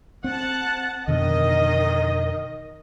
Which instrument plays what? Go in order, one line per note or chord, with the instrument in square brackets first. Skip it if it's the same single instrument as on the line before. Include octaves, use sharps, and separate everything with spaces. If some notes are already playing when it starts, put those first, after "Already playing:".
[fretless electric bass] C4 [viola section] F#5 A5
[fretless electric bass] F2 B2 D3 [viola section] D#3 D#5